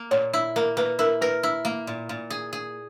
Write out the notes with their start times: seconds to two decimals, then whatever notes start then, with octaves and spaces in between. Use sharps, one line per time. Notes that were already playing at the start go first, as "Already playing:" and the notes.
Already playing: A#3
0.11 A#2 C#5
0.33 E4
0.56 A#3 A#4
0.77 A#3 B4
0.99 E4 A#4
1.21 A#4 B4
1.43 E4
1.65 A#3
1.87 A#2
2.09 A#2
2.30 G#4
2.53 G#4